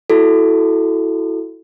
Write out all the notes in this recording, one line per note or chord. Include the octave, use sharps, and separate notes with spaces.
E4 F#4 A4